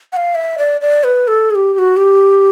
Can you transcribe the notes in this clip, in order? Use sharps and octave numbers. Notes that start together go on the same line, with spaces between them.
F#5
F5
E5
D5
D5
B4
A4
G#4
G4
G4
F#4
G4